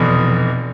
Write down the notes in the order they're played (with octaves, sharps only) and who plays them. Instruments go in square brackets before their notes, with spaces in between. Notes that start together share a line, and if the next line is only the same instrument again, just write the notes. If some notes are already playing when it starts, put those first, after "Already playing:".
Already playing: [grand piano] F1 E2 B2